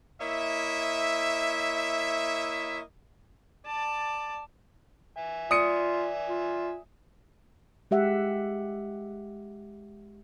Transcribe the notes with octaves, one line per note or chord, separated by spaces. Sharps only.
A#3 E4 C#5 D#5 E5
D5 A5
E5 G#5
F4 D5 D#6 C#7
F4
G#3 G4 E5 F#5